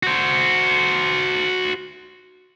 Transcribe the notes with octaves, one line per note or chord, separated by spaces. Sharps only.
F#4 C5